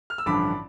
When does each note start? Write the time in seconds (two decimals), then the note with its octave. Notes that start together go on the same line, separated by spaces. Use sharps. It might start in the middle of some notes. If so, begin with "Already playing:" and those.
0.10 F6
0.18 E6
0.26 A1 G2 D3 F3 B5 D6